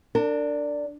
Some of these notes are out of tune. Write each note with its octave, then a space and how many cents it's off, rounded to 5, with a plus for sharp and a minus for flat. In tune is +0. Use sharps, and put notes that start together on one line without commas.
D4 +0 A#4 -40